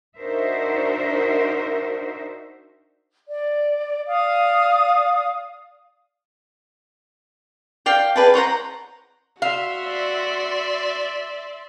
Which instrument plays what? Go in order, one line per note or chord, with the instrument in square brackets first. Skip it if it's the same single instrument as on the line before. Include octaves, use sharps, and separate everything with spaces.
[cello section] D4 D#4 F#4 A#4 C5 E5
[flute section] D5
D5 F5 D#6
[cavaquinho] D5 F5 G5 D6
G#4 B4 D5 A5
C5 C#5 F#5 A#5
[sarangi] F#4 [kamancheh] E5 C6 [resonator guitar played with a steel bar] F5
[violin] D5